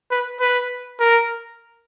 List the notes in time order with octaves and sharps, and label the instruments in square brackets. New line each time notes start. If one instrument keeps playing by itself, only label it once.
[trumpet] B4
B4
A#4